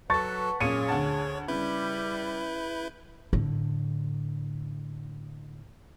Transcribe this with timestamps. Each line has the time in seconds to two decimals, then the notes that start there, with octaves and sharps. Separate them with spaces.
0.10 F#3 A4 B4 F#5 A5 C#6 A6
0.60 F#2 A#2 G#4 C#5 C#7 D#7
0.88 D2 F#5 A5
1.48 C#3 G3 E4 B4 G6
3.33 A2 D3